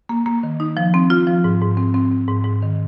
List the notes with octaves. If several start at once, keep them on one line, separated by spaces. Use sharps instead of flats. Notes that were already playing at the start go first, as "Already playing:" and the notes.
A#3
A#3
D#3
D#4
F3
C4
F4
F3
G#2
G#2
C4
C4
C4
G#2
G#2
D#3